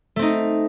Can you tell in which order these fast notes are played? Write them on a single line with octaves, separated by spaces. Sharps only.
A3 C4 D#4